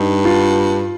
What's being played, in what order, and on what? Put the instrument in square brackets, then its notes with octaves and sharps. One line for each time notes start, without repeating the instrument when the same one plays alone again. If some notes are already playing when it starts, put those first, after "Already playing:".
Already playing: [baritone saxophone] G2 [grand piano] D#4
[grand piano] F4